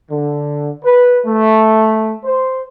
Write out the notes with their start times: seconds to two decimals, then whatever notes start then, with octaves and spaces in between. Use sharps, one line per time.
0.11 D3
0.85 B4
1.26 A3
2.25 C5